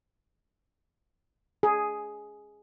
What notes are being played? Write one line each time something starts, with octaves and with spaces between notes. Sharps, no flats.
G#4